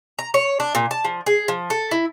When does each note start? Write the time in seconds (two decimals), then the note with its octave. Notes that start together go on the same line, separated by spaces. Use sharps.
0.19 A#5
0.34 C#5
0.60 D4
0.75 A#2
0.91 A5
1.05 F3
1.26 G#4
1.48 F3
1.70 A4
1.91 E4